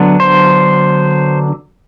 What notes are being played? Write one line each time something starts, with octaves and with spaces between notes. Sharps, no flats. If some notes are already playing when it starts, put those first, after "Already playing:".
Already playing: D3 F#3 B3 D4
C5